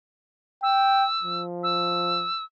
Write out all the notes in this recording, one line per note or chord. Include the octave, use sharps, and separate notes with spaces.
G5 E6
F3
E6